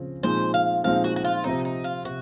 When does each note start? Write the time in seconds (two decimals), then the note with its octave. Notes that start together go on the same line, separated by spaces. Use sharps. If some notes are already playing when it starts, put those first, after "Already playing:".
Already playing: C#3 F3 C4
0.23 A#2 F3 G#3 C4 D#4 C5
0.54 F5
0.84 A#2 F3 G#3 C4 D#4 F5
1.04 F#4
1.16 F#4
1.24 F4
1.44 C3 F3 C4 D#4
1.65 D#4
1.84 F4
2.05 C3 F#4